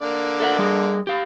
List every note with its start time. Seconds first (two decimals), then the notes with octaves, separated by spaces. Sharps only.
0.02 D3 A#3 D5
0.40 A4 E5 F#5
0.59 G3 G#4
1.07 G4 F5